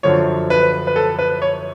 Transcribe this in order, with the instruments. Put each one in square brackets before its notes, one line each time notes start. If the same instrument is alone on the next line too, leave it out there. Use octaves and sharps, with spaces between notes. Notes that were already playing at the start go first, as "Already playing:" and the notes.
[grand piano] F#2 D3 F3 C#5
B4
B4
A4
B4
C#5